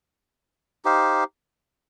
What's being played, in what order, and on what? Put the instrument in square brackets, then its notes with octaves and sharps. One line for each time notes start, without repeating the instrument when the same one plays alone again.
[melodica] D#4 G4 C5 F5